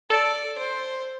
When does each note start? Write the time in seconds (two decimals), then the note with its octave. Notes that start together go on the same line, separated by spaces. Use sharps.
0.10 A4 D5
0.58 C5